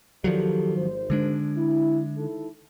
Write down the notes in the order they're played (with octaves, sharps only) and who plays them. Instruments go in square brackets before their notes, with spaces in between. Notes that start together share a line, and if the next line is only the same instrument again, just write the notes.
[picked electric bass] D#3 F3 F#3 [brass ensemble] G4 A4 D5
[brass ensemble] G#1 C5
[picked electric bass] D3 G#3 D4
[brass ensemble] E4
D#3 E4 A4